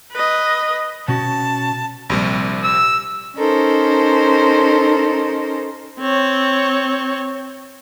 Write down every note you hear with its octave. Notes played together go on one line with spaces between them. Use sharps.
B4 D#5
B2 C#4 F#4 A5
A#1 C3 G3
E6
C#4 D#4 A4 A#4 C5
C4 C#5